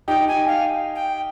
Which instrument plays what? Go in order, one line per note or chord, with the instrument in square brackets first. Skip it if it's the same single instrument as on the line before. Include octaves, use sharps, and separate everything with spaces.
[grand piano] D#4 G4 [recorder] G5
[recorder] G#5
F5
G5